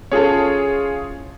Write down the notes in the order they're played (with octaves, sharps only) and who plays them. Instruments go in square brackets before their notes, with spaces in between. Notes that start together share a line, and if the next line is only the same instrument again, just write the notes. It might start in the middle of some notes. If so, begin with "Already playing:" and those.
[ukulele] C#4 E4 A4 [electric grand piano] F4 G#4 C#5